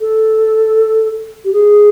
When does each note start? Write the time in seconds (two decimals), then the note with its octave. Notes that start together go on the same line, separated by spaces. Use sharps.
0.01 A4
1.45 G4
1.53 G#4